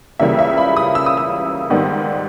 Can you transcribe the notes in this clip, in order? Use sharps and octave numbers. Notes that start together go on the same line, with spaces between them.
C#2 C#3 E3 G3 A#3 E5
E5
B5
D#6
E6
D#6
E6
G#2 D#3 G3 B3